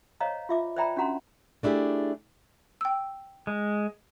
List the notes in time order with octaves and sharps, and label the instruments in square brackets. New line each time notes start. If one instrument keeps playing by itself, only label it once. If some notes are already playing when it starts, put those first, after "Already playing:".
[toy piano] C5 C#5 D#5 F5 A#5
F4 E5 D6
C5 D5 E5 G5 A#5 B5
C#4 D4 F#4 F#5 A#5 C6
[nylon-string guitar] A3 D4 E4 G4 G#4
[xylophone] G5 E6
[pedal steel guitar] G#3